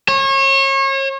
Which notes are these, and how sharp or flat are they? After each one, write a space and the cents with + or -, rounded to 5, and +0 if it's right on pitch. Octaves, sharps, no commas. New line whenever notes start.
C#5 -35